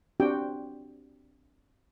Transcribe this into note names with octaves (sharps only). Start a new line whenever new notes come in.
C4 D4 F#4 G4 G5